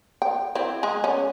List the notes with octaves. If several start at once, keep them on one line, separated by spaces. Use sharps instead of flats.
G5
C4 E4
G#3 G#4
C#4